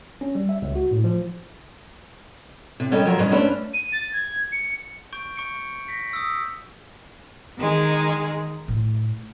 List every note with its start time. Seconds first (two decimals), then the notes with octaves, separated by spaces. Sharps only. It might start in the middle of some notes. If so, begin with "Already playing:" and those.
0.21 C#4
0.35 G3
0.49 E5
0.62 C#2
0.75 F#4
0.91 A2
1.04 F3
2.80 C3
2.91 G3 C#4 G4 A4 A#4 D#5
3.05 F3 F#3 A#4 C5
3.18 G2 C3 C#4 G#4 D#5
3.31 A3 C#4 D4 B4 C5
3.74 D#7
3.93 A6
4.13 G#6
4.52 C#7
5.13 C#6 G6 D7
5.36 C#6 C#7 D7
5.88 A#6 B6
6.13 D#6 E6
7.59 D#3 G#3 G#4
8.68 A2